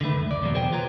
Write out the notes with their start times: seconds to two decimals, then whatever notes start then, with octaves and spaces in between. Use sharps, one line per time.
0.01 D3 D#3 A3 B4
0.14 C#2 F#2
0.31 D5
0.42 E2 B2 D3 F3 F#3 A#3
0.55 G#4 C5 C#5 G5
0.72 F4 B4 C#5 A#5